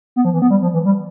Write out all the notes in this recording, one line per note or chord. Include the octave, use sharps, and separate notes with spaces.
B3
F3
E3
B3
G3
F3
E3
G3